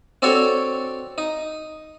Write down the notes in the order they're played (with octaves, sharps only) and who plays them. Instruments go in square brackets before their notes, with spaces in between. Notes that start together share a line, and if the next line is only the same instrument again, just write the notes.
[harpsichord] C4 D4 F#4 A4 C#5
D#4